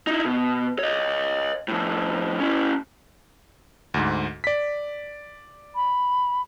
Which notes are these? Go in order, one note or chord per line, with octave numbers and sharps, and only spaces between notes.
D#4 E4
B2
C#5 D#5
A2 F3
C#4 E4
D2 G#2
D5 B6
B5